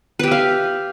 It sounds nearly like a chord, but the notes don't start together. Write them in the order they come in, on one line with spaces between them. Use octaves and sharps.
B4 G4 E5 F5